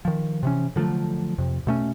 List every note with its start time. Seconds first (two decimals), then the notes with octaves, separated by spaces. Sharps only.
0.05 D#3 F3
0.43 C3 E3 C#4
0.76 D3 F3 F#3 A3
1.38 F2 C3
1.67 B2 A3 C#4